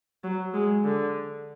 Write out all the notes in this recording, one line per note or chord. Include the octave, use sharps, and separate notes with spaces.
F#3
G#3
D3